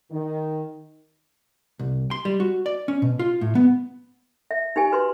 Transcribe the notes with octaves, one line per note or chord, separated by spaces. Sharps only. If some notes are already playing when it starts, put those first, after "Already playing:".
D#3
C2
C6
G3
F#4
D5
C#4
B2
F4
A2
B3
E5
D#4 G4 G#5
F#4 B4 C6